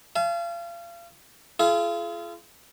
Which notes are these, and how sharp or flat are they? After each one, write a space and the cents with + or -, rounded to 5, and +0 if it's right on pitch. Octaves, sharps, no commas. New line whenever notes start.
F5 -35 A5 -45
F4 -35 G#4 +40